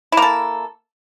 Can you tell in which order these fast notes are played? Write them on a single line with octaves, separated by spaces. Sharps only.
E4 A#3 A4